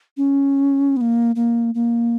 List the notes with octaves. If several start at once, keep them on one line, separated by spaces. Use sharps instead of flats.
C#4
B3
A#3
A#3
A#3